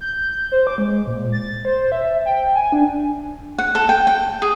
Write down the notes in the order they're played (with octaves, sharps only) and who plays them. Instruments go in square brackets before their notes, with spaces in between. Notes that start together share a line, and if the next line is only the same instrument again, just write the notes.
[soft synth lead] G6
C5
D6
G#3
A#2
A6
C5
E5
G5
G#5
D4
[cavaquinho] F#5
A4
G5
G5
G#4